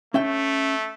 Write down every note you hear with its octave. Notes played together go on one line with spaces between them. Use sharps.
A3 C#4 E5 G5